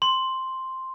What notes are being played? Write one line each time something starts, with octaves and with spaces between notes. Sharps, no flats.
C6